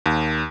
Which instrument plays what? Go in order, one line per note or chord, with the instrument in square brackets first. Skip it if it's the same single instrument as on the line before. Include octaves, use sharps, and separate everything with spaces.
[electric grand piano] D#2